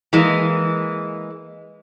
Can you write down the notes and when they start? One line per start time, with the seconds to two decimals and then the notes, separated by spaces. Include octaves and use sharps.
0.13 E3 G#3 A#3